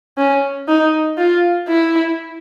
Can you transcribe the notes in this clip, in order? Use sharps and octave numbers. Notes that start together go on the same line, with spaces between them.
C#4
D#4
F4
E4